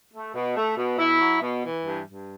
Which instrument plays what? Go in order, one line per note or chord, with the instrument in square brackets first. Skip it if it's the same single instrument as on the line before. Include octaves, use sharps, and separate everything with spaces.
[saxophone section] A3
B2
A3
B2
B2 E4
F#3
B2
E3
G2
G2